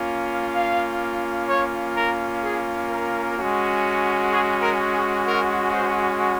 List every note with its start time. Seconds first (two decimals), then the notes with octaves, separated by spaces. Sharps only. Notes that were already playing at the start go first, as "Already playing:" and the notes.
Already playing: A#3 C#4 F4
0.54 F5
1.48 C#5
1.96 A#4
2.42 G#4
2.89 A#4
3.37 G#3 C#4 F#4
4.30 G#4
4.62 A#4
4.93 G#4
5.25 A#4
5.73 C5